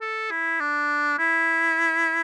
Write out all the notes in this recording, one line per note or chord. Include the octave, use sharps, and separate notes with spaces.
A4
E4
D4
E4